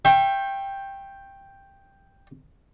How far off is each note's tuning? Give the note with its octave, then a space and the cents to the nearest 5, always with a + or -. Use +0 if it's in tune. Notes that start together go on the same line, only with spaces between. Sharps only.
E5 +25 G5 +5 C#6 -40